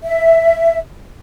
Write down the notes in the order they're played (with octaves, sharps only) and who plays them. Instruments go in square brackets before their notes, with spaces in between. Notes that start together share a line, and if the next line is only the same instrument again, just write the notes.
[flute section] E5